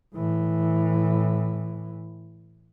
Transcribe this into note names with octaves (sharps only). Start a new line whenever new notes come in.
A2 E3